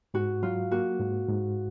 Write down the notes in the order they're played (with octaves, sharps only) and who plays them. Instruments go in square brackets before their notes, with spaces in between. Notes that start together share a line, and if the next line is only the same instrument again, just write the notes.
[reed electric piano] G#2 [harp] F#4
[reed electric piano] F#3 [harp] F4
[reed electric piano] A#3 [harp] F#4
[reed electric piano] G#2
G#2